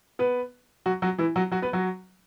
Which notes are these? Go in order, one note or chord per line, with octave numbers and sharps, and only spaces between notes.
B3 B4
F#3 F#4
F#3 F#4
E3 E4
F#3 F#4
F#3 F#4
B3 B4
F#3 F#4